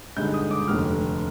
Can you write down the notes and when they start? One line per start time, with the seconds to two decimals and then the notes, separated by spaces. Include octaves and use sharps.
0.17 G2 D3 G#3 D#4 G6
0.34 D#6
0.51 D6
0.68 F1 D#2 D3 F6